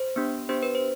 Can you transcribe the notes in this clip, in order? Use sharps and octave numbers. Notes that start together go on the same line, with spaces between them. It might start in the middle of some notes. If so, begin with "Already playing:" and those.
Already playing: C5
B3 D4 G4
B3 D4 G4 C5
B4
C5